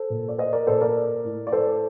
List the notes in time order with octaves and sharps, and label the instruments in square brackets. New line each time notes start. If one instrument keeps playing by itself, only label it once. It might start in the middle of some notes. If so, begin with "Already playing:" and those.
Already playing: [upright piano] A4 C5
A#2
D5
C5 D#5
A#4 D5
A#2 A4 C5
A#4 D5
A2
D5
A4 C5